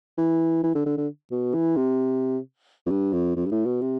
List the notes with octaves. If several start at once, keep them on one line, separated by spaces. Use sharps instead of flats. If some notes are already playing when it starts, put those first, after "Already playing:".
E3
E3
D3
D3
D3
B2
E3
C3
F2
G2
F2
F2
G2
A2
B2
C3